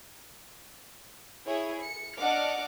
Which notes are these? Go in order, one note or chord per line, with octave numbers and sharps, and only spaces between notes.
E4 G#4 C#5
C#7
D4 D#5 F#5 D6 F6